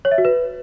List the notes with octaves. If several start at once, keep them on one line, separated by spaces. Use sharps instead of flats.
C#5
E5
F#4
B4